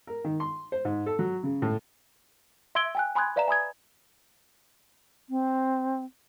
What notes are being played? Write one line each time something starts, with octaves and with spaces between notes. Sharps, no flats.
A#4
D#3
C6
C5
G#2
A4
F#3
C#3
A2
E5 C6 E6 G#6 D7 G7
G5 G#5 F#6
G#5 B5 C6 D#6 F#6 G#6
B4 D5 E5 F5 A#5 E7
G#5 B5 D#6 G#6
C4